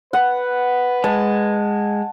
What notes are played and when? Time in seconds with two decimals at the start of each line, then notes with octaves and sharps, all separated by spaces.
0.13 B4 F#5
1.04 G#3 A5